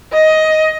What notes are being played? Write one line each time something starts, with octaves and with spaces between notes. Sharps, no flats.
D#5